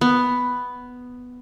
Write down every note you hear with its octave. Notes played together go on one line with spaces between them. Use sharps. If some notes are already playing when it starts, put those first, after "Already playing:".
B3